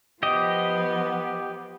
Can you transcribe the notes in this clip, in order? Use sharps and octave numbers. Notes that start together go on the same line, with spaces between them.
F3 B3 G4 D#5